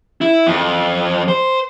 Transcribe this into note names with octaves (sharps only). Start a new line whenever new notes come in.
E4
F2
C5